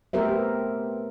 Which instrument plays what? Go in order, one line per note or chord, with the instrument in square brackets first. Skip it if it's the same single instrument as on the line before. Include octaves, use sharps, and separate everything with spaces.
[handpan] A3 B3 G4 A#4 C5 E5